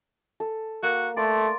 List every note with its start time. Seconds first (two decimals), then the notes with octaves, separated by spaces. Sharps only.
0.40 A4
0.83 A#3 F#4
1.17 A3 D5 C6